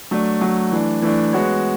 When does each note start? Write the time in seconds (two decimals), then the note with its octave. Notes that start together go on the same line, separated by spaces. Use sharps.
0.11 F#3 A3 D4
0.41 F#3 A3 D4
0.72 E3 A3 D4
1.02 E3 A3 D4
1.33 G#3 B3 F#4 C#5